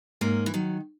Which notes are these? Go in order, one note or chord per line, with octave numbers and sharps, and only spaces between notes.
G#2 A#3 C#4
E3
D#3 F#3